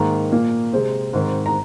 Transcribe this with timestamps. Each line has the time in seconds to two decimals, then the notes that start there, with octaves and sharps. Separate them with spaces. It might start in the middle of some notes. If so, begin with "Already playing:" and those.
Already playing: G#2 D#3 A#3 A#5
0.32 A#2 A#3
0.73 C3 G#3 C4
1.13 G#2 D#3 C4
1.46 A#5